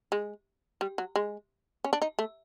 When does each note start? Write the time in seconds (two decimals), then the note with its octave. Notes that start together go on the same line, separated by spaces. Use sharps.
0.12 G#3
0.81 G3
0.98 F#3
1.16 G#3
1.84 C#4
1.93 D4
2.02 D#4
2.19 A3